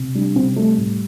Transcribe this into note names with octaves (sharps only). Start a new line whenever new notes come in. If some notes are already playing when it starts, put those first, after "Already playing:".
Already playing: C3
G3 D4
C3 C4
G3 A3
A2